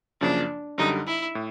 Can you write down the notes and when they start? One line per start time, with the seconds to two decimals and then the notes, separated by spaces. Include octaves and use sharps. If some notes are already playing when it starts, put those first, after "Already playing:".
0.21 F#2 C#3 F3 A#3 D4
0.78 F#2 D3 G3 D#4
1.07 E4
1.35 A2